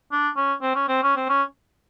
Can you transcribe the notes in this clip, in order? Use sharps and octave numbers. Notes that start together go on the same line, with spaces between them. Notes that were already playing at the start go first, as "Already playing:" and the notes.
D4
C#4
C4
C#4
C4
C#4
C4
C#4